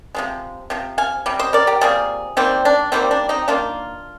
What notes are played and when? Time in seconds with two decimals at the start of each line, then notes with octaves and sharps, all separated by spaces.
0.15 C3 F3 G#3
0.70 C3 F3
0.98 F5 G#5
1.26 C3 G3
1.39 C5 D#5
1.53 A#4 D5
1.67 G4 A#4
1.81 C3 G3 A#3 F4 G#4
2.37 D#3 G3 A#3 C4
2.65 D4
2.92 D#3 G3 A#3 C4
3.11 D4
3.29 C4 D#4
3.48 D#3 A#3 D4 F4